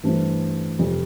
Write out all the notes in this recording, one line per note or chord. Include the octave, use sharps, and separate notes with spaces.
G2 E3 A3 C4 E4
F1 F2 C3